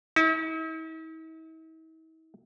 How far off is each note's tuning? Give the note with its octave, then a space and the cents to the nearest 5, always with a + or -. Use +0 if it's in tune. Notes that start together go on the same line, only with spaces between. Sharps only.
E4 -45